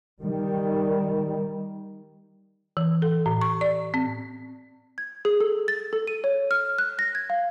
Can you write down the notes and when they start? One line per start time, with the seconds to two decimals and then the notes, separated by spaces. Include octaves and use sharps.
0.22 D#3 G3
2.77 E3
3.02 A4
3.26 A2
3.41 C#6
3.61 D5
3.94 C4
4.98 G#6
5.25 G#4
5.41 A4
5.68 A6
5.93 A4
6.07 D#7
6.24 C#5
6.51 F6
6.78 F#6
6.99 A#6
7.15 G#6
7.30 F5